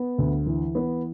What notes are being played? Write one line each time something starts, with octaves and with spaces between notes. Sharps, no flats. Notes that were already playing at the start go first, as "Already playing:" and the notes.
Already playing: B3
D2
E3
B3